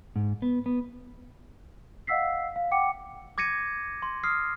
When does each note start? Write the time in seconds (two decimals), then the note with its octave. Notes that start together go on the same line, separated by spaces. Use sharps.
0.16 G#2
0.42 B3
0.66 B3
2.07 D#5 F5 F#5 E6 B6 C7
2.56 F5
2.71 F#5 G5 D6 C#7
3.38 D6 G#6 A#6 C#7 D#7
4.02 C6
4.23 D#6 F6 C7